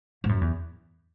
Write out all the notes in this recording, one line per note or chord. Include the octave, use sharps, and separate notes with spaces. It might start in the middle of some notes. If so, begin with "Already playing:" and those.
G#2
F#2
E2